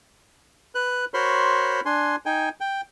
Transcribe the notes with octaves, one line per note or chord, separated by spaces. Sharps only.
B4 F#6
F#4 A#4 C5 C#5 B5 C6
D4 G#5 C6
D#4 G5 G#5
G5